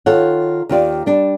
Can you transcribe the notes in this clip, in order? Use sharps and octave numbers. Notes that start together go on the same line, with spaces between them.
D#3 F4 A4 C#5 F#5
D#2 D#3 F4 G4 D5
G3 D4